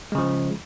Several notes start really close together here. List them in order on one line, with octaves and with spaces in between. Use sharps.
G#3 C#3 F3